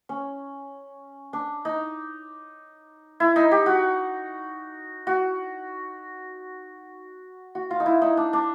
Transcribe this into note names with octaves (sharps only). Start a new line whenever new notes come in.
C#4
D4
D#4
E4
D#4
G4
F#4
F#4
F#4
F4
D#4
E4
D#4
D4
D4